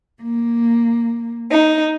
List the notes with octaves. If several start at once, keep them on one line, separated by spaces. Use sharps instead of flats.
A#3
D#4